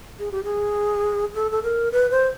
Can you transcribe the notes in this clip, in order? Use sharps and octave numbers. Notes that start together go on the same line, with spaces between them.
G#4
G4
G#4
A4
A4
A#4
B4
C5